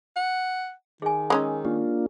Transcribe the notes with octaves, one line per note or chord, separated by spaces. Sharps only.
F#5
D#3 G#4 G#5
G#3 C#4 D#4 G#4 A#4
A#3 D4 F4 G4